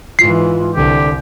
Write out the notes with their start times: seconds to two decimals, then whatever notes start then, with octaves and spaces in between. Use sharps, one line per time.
0.19 G#2 E3 F4 C7
0.75 C2 D3 G4